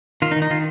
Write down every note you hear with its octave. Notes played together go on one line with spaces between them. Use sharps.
D#3 F4
D#4
D#3
D#4
D#3 F4